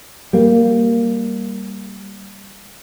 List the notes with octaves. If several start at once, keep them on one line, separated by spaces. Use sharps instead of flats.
G3 A#3